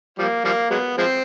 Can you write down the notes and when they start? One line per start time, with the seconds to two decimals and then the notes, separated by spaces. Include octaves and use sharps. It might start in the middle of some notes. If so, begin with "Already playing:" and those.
0.19 F3 G3 A#3
0.44 F3 G3 A#3
0.70 F#3 G#3 B3
0.98 F3 G#3 C4